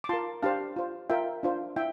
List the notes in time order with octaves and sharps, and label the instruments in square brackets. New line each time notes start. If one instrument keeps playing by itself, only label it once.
[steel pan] D6
F4 A#4 A5 C6
D4 G4 C5 F5 A5
F4 C5
F4 A#4 E5 G5
D4 F4 C5
E4 E5 G5